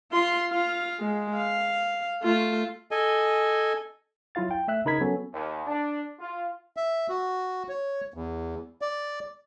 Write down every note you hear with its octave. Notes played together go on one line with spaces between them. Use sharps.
F4 C6
F4 F5
G#3
F5
A3 F4
A4 D#5 G#5
F#3 E4 F4 F5 A6
G5
A3 E5 F#6
C#3 D#4 A#4 B5 G#6 B6
F#3 B3 C#4 F#4 A4
D#2
D4
F4
E5
F#4
C#5
E2
D5